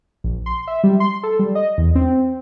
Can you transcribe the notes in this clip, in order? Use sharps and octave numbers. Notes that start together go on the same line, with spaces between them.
A#1
C6
E5
G3
C6
A4
G3
D#5
E2
C4